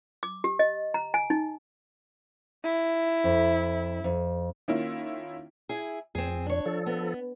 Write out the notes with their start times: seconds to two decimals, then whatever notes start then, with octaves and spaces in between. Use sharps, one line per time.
0.23 D6
0.44 G4
0.59 D#5
0.94 A#5
1.14 G#5
1.30 D#4
2.64 E4
3.24 F2
4.04 F2
4.68 D#3 A#3 C#4 E4 F4
5.69 E4 G#4
6.15 F2 C4 G#4
6.46 D4 C#5
6.66 F3 A4
6.86 B3